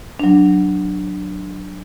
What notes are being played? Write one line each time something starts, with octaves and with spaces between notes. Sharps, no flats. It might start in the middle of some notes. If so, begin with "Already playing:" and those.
F#3 D4